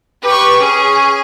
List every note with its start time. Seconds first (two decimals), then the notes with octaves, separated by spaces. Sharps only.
0.25 G4 B4 C#6
0.62 C#4 G#4